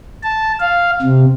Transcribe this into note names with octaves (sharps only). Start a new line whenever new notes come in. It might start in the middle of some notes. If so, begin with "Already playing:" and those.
A5
F5
C3